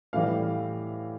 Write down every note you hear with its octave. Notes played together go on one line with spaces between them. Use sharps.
A2 E3 G3 F5